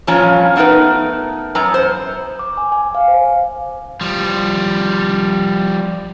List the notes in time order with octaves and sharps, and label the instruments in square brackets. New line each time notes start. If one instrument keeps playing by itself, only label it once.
[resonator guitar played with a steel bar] G2 A#2 F3 C#4 A#5
A3 B3 D#4 A#4 B4
F#2 B3 A#5
C5
[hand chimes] D6
G#5
G#5
F5
C5
[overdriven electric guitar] F3 G3